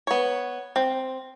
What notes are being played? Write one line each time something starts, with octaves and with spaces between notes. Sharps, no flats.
B3 C#5
C4